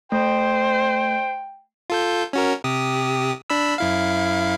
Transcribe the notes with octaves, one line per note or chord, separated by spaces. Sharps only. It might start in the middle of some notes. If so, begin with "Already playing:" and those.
A3 C5 G5
F4 A4 G6
C#4 F#4 A#4
C3 G4 D#6
D4 B5 E6
F#2 E4 F5